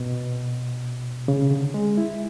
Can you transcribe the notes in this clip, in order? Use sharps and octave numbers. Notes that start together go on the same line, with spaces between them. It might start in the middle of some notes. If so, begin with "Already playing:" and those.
Already playing: B2
C#3
D3
G#3
E4